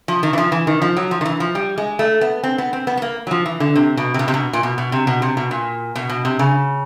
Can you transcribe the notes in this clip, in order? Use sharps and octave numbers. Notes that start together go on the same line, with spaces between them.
F3
D#3
E3
F3
E3
D#3
F3
F#3
F3
D#3
E3
F3
G3
G#3
A3
B3
C4
B3
C4
B3
B3
A#3
F#3
F3
E3
D3
C3
B2
C3
B2
C3
B2
A#2
B2
B2
C3
B2
C3
B2
A#2
B2
B2
C3
C#3